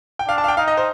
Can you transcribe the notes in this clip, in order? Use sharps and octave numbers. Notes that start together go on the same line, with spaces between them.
G5
D4 F5
A5
F5
G5
D#4 F5
D#5
C5